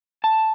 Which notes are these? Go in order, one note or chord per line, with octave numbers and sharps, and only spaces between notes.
A5